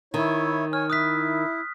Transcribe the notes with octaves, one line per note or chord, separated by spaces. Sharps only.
D#3 E4 C#5
C#5 G#5 F6
E4 D#6 F#6 B6